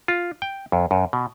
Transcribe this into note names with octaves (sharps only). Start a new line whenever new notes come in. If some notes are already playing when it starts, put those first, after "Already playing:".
F4
G5
F2
F#2
B2